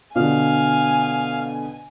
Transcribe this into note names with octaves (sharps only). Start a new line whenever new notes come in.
B2 D3 F5 G#5